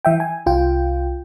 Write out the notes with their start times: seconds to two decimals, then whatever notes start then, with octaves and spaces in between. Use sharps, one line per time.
0.05 E3 E5 G5
0.20 G#5
0.46 C2 F4 G5